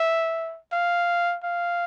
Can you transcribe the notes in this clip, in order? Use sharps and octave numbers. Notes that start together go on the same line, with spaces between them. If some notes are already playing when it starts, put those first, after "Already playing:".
Already playing: E5
F5
F5